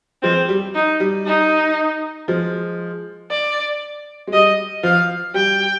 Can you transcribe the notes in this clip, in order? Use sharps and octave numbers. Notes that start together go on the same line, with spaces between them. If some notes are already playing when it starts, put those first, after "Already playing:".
F3 G#3 C4
G3
D#4
G3
D#4
F3 G#3
D5
G#3
G3 D#5
F3 F5
G3 G5